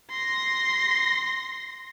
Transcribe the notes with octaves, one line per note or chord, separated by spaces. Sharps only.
C6 A#6